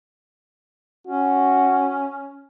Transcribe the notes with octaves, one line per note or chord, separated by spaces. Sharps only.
C#4 F#4